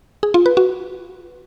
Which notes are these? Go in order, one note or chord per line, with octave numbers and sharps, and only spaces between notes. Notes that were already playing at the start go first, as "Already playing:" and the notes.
G#4
F4
B4
F#4